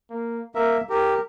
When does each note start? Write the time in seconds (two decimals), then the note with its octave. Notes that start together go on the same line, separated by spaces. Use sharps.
0.10 A#3
0.55 A#3 A#4 E5
0.89 G4 A#4